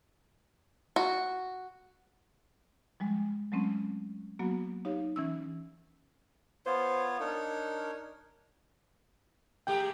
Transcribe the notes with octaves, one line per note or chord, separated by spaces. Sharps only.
F#4
F3 G3 G#3
F#3 G#3 A3 C4 C#4
F#3 A#3 B3 F#4
D#4 G4 C#5 F5
E3 C#4 E6
B3 F4 C5 C#5
D4 D#4 A#4 C#5
G#3 A3 G4 G5